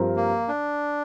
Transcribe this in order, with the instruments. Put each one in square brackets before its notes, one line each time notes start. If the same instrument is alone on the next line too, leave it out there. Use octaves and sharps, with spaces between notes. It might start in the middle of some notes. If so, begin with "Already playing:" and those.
Already playing: [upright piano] G2 F3 C4 G4 A#4
[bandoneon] A#3
D4